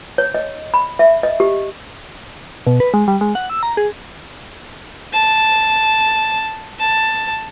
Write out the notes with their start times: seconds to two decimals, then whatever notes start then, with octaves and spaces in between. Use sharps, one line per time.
0.18 C#5
0.34 D#5
0.74 B5
0.99 E5
1.23 D#5
1.40 G4
2.67 B2
2.80 B4
2.94 G#3
3.08 G3
3.21 G#3
3.35 F#5
3.50 E6
3.63 A#5
3.77 G#4
5.13 A5
6.79 A5